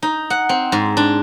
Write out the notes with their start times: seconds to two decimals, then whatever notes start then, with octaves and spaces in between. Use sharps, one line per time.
0.02 D#4
0.30 F#5
0.49 C4
0.72 G#2
0.97 D4